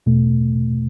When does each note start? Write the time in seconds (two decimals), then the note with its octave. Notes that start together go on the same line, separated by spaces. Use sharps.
0.06 E2 B2 A3